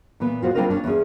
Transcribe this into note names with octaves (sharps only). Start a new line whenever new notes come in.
A#2 E3 B3
F4 F#4 C5
G3 C4 D4 F4 A#4 D#5
C#4 D4 C#5
E2 C#4 G#4